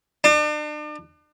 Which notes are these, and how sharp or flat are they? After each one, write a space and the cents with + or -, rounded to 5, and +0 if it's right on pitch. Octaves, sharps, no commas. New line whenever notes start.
D4 +40